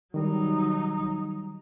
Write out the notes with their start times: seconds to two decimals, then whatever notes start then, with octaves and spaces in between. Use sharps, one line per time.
0.14 D#3 F#3 G3 D#4